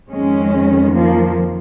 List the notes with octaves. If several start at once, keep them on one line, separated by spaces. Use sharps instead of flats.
F2 D#3 G#3 C#4
F3 A#3